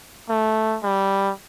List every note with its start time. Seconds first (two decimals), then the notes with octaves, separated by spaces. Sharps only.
0.29 A3
0.83 G3